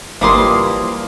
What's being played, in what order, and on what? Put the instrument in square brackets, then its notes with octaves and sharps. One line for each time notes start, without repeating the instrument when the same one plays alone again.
[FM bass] G#1 [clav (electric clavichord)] E3 F3 G3 [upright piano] A#3 [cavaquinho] C6 D6 D#6